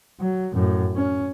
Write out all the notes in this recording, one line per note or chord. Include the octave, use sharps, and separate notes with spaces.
F#3
F#2 A2
C#4